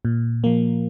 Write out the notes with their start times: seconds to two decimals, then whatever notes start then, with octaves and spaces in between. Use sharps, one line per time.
0.05 A#2
0.44 F3 A#3